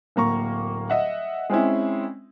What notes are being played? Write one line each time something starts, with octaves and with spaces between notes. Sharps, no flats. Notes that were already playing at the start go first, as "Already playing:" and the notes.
D1 A#3 A#5 C#6
D#5 E5 F#5
G#3 C4 C#4 E4